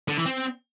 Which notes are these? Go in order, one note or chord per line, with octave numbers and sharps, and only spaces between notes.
D3
E3
C4